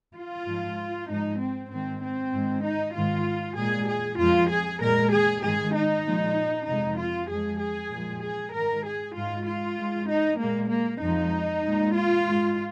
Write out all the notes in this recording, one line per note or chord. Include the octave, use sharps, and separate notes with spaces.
F4
G#2 F3 G#3
G#2 F3 G#3 D#4
C4
G#2 D#3 G#3 C4
C4
G#2 D#3 G#3
D#4
G#2 D#3 G#3 F4
A#2 G#3 G#4
G#4
F2 F3 G#3 F4
G#4
A#2 G#3 A#4
G#4
G#2 D#3 G#3 G#4
D#4
A#2 F3 G#3
F2 C3 G#3 D#4
F4
F2 F3 G#3 G#4
G#4
A#2 F3 G#3
G#4
G#2 D#3 G#3 A#4
G#4
G#2 G#3 F4
F4
G#2 G#3
D#4
A#2 G#3 A#3
A#3
F2 F3 G#3 D#4
A#2 G#3
F4
G#2 G#3